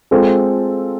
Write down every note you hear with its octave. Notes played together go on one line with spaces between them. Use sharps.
G#3 C4 F4 A4